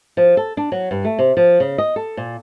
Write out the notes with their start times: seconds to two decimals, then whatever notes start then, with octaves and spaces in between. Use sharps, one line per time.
0.17 F3
0.37 A4
0.57 D4
0.72 F#3
0.91 G2
1.05 A3
1.19 C3
1.37 F3
1.60 C#3
1.78 D#5
1.96 A4
2.17 A#2